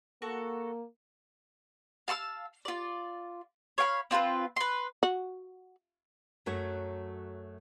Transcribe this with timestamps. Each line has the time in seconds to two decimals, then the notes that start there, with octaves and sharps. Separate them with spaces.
0.22 A#3 F#4 A4 C#6
2.08 F5 A5 C#6 E6
2.65 F4 D5
3.78 C#5 F5 G5 B5
4.11 C4 F4 A#4 B4
4.56 B4 C6
5.03 F#4
6.46 F#2 F#3 A3 F#4 C#5